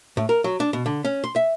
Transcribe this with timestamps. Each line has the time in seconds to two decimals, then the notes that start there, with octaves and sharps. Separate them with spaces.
0.17 A2
0.29 A#4
0.44 F#3
0.60 D4
0.73 B2
0.86 D3
1.04 C#4
1.24 C6
1.36 E5